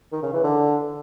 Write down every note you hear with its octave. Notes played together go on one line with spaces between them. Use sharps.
D#3
C#3
E3
D3